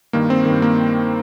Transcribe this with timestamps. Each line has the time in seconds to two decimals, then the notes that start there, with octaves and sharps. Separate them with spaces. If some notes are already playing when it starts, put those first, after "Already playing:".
0.13 G2 D#3 A#3
0.30 C4
0.46 G2 D#3
0.62 A#3